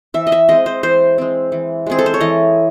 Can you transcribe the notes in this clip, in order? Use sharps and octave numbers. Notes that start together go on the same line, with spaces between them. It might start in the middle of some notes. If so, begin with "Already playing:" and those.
E3 E5
D#5
E5
G#3 C4 D#5
C5
E3 C5
G#3 C4
E3
G#3 C4 G#4
A4
C5
C#5
E3 D#5